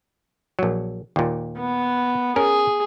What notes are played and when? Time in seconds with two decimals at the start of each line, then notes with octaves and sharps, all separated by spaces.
0.59 A#1 F#3
1.16 D#2 A#2
1.58 B3
2.36 C#4 G#4 A#4